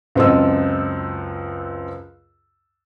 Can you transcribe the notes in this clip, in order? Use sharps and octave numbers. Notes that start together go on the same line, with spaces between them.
C#2 F#2 C4 A4 D#5 E6